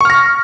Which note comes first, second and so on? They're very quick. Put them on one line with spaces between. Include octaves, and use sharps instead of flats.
C#6 F6 A#6